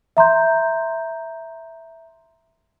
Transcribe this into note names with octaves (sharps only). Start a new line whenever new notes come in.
E5 A#5 C6 G6